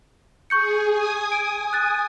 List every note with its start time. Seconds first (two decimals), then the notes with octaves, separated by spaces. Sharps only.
0.50 G#4 C#6 G6 C#7
0.86 G#5 D#6
1.32 D7
1.73 F#6 A6